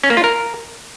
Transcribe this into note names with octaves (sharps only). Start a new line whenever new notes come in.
C#4
A#3
F4
A#4